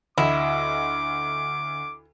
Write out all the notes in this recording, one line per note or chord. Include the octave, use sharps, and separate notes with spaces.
D2 E4 D#5 D6